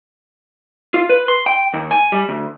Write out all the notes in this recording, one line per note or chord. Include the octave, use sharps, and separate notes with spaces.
F4
B4
C6
G5
D#2
G#5
G3
D2